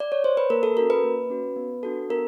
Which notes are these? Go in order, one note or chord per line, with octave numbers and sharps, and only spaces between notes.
D5
C#5
C5
B4
A#3 A#4
A4
C#4 F#4 A#4
B4
A#3
C#4 F#4
B3
D4 F#4 A4
B3 A#4